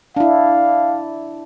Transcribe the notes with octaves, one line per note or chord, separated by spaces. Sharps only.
D4 E4 F5